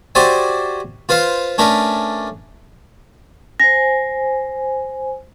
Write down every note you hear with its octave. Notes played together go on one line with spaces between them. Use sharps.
F#4 G4 C5 D5 E5 G#5
F4 B4 C5 F5
A3 C#4 D4 A#4 B4
C5 G#5 A#6